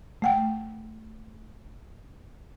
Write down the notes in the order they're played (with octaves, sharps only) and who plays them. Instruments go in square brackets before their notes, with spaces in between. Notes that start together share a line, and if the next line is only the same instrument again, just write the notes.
[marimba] A3 F#5 G5